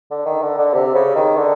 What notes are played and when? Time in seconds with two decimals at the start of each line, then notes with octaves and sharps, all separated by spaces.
0.11 D3
0.26 D#3
0.42 D3
0.58 D3
0.74 C3
0.95 C#3
1.16 D#3
1.37 D3